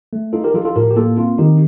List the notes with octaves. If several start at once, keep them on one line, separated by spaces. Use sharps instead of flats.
A3
D#4 F4 A4
G4 A#4
F3 F4 A4
F4 A4
A2 G4 A#4
G4
A#3 F4 A4
C4 F4
D#3 D#4 G4